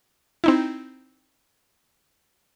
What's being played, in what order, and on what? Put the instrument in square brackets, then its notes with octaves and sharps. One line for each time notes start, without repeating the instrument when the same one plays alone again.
[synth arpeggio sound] C4 D#4 E4